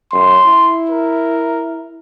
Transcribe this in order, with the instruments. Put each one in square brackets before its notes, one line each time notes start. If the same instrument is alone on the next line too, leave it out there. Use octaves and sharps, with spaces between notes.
[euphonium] F#2 [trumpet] C6
[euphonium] E4
[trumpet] A#4